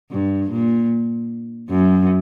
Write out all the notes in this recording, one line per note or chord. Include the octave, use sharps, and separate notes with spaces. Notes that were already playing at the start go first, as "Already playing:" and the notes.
G2
A#2
F#2